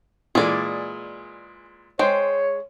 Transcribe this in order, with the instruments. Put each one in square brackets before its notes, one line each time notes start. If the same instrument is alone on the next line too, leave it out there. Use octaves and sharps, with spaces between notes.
[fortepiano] A#2 E3 G#3 [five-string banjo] G#4 D5
[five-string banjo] G#3 [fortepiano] C5 G5 [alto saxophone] C#5